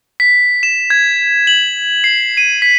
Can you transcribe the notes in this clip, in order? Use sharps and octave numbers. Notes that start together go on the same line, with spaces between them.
B6
E7
G#6
F#7
C7
D#7
B6